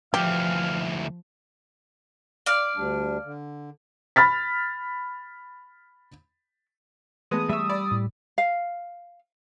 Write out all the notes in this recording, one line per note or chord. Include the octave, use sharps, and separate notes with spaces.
D2 E3 F3 G4 F5
D5 F5
D2 G3 D4
D3
B5 F6 A6 B6
E3 G#3 A3 B3 A5 D#6
G3 E5 C#6 E6
D5 B5
A2
F5